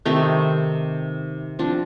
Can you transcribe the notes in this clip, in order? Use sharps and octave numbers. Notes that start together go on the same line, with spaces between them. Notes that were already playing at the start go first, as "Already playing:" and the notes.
C3 D#3 A3 C4 D#4
F3 C4 D4